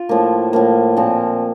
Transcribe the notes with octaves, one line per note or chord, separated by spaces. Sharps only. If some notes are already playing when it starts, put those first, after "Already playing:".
Already playing: F4
A2 F3 A#3
A2 F3 A#3
A#2 F3 C4